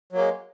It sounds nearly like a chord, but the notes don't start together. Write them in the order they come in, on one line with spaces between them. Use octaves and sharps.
F#3 A#3 G#3